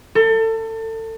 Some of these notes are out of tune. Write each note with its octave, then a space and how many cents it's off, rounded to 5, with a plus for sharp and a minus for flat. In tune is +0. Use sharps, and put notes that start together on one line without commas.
A4 +30